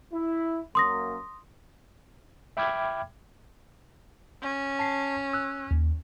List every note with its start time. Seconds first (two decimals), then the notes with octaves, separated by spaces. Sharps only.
0.13 E4
0.75 F#2 A#3 C6 D#6 A#6
2.57 E5 G5 B5 D6 F6 G#6
4.42 C#4
4.79 A5 B6 C7
5.33 E6 F#6
5.71 D#2